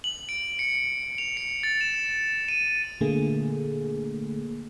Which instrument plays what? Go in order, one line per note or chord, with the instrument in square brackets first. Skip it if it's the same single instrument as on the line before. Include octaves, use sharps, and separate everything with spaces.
[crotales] F#7
D7
C#7
F7
C#7
A6
E7
D#7
[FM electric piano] A#2 D3 A3 A#3 G#4